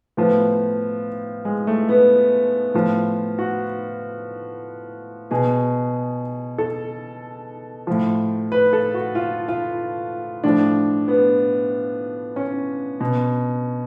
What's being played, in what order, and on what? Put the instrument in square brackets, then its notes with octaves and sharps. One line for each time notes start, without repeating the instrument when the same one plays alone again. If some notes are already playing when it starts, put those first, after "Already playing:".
[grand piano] A2 F3 B3
G#3
A3
B3
A2 F3
F#4
B2 G#4
A4
A2 F3
B4
A4
F#4
F4
F4
A2 F3 D4
B3
C#4
B2